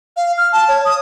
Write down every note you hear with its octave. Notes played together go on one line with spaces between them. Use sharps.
F5
F6
A5
C#5
D#6